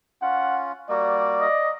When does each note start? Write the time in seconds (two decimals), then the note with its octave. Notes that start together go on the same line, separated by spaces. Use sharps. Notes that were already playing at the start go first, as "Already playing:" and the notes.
0.22 C#4 F4 F#5
0.89 G3 A#3 F#4 D5
1.41 D#5